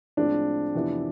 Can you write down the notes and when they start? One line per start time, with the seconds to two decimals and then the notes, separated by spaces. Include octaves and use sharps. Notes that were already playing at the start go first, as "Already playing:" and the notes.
0.17 A2 F3 G#3 C4 D4
0.74 F2 C3 E3 B3 E4